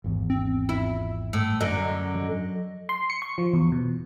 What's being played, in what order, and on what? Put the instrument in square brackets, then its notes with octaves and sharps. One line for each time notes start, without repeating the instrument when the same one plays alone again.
[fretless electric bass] G#1 E2
[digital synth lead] C4
[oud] E4
[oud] A2 [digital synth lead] E6
[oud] F#2 D3 [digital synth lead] D#5
[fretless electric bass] F#3
[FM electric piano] C6
C#7
C#6
F3
E2
B2